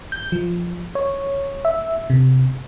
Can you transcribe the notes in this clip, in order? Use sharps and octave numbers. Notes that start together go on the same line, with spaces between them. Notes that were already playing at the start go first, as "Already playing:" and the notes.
G6
F3
C#5
E5
C3